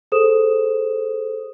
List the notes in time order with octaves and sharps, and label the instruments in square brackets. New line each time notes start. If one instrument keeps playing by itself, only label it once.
[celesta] G#4 A4 C5 D#6 E7